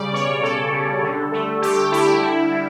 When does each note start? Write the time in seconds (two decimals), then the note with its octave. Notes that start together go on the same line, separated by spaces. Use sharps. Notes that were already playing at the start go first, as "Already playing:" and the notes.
Already playing: C#3 G3 D5
0.13 B2 C#5
0.43 G3 A4
0.72 G3
1.03 D3
1.32 A3
1.62 D3 G4
1.92 D3 E4
2.21 G3
2.51 G3